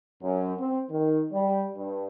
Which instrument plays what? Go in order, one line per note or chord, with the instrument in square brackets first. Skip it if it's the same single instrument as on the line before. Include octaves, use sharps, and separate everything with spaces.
[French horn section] F#2
C4
D#3
G3
G2